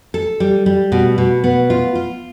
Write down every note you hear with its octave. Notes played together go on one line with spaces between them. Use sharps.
A4
G3
G3
B2
B2
B3
F4
F4